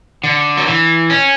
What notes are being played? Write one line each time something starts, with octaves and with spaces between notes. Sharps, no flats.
D3
F#3
E3
C#4